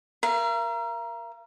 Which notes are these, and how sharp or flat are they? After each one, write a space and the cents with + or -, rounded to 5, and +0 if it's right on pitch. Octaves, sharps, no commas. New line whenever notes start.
A#4 +15 F5 -45